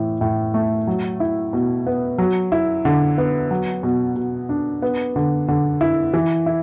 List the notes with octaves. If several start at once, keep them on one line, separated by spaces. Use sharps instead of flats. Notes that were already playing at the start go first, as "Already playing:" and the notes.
Already playing: A2 E3
A2
A3
F#3
E4
B2
B3
F#3
E4
D3
B3
F#3
B2
B2
D4
B3
D3
D3
E4
E3
E4